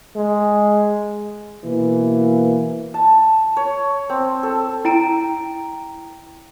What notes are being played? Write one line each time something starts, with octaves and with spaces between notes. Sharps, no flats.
G#3
B2 E3 A#3
A5
C#5
C4
A4
E4 G5 A#5 D7